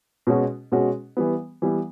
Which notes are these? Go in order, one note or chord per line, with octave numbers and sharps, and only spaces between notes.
B2 G#3 C#4 F#4
B2 G#3 C#4 F#4
E3 G3 B3
E3 G3 B3